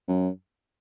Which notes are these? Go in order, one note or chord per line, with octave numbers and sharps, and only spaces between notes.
F#2